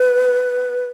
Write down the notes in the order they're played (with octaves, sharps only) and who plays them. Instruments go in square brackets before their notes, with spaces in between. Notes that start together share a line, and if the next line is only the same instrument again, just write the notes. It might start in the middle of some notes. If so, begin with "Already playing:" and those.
Already playing: [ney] B4